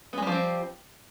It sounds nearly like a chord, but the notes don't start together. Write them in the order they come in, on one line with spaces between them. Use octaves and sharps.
B3 G#3 G3 F3 C4